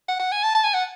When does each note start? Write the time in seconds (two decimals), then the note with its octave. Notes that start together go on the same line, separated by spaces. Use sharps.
0.08 F#5
0.20 F#5
0.32 G#5
0.43 A5
0.55 A5
0.64 G#5
0.74 F#5